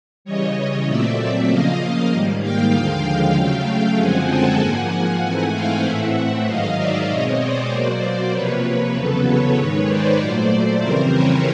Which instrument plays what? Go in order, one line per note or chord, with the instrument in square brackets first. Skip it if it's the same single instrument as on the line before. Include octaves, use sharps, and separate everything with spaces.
[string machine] C#3 E3 G3 C#5 D#5
A#2 F#3 A3 C4 D5 E5
D5 E5
C#3 F3 A#3 D#5 F5
G#2 D#3 G3 A#3
F5 G5
D#2 D3 F3 G#3 F5 G5
C#3 F#3 A3 F5 G5
F#2 D3 F3 G#3 C4 F#5 G#5
G5 A5
G#2 F3 A#3 F#5 G#5
F#5 G#5
G#2 E3 A3 C4
F5 G5
A2 E3 A3 C4 E5 F#5
G#2 D#3 F#3 D#5 F5
D5 E5
B2 G#3 C4 C#5 D#5
C5 D5
B2 F#3 A#3 C5 D5
C5 D5
C3 F3 A#3 B4 C#5
E2 C#3 F#3 B3 A4 B4
B4 C#5
G#2 D#3 G#3
C5 D5
A#2 F#3 A3
F2 C#3 E3 G3 C4 A#4 C5
B4 C#5